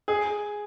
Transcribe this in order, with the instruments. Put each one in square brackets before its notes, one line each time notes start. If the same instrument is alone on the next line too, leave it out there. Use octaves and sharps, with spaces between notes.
[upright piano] G#4